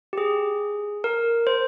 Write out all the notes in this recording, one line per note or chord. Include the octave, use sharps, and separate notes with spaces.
G4
G#4
A#4
C5